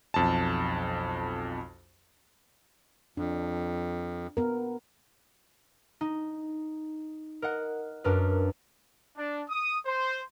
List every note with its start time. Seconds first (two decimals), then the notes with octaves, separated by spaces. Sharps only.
0.14 B1 F2 A5
3.17 F2 D4
4.37 B3 A#4
6.01 D#4
7.42 A#4 D#5 F#5
8.04 F#2 D4 A#4 B4
9.16 D4
9.50 D#6
9.85 C5